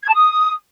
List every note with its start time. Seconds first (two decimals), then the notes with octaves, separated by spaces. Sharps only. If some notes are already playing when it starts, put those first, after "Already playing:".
0.03 G#6
0.08 A5
0.14 D#6